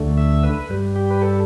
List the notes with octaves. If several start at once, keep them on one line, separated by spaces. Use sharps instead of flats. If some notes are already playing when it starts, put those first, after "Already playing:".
Already playing: D2 D3 A3
E5
B4
G2 G3
G4
B4
A4